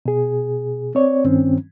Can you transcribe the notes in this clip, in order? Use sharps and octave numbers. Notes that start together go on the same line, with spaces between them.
B2 G#4
C4 C#5 D5
G2 D#3 C4 C#4